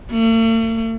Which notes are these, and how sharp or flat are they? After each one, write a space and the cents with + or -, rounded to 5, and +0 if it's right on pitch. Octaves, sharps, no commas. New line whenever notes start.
A3 +45